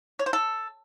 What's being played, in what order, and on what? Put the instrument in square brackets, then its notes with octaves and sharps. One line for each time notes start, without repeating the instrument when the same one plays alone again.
[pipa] C#5
C5
A4